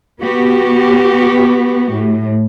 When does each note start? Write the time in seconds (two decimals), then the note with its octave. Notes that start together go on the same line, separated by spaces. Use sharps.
0.20 B3 F#4 G4
1.91 A2